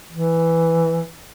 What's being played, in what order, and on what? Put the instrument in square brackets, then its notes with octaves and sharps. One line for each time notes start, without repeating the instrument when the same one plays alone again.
[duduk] E3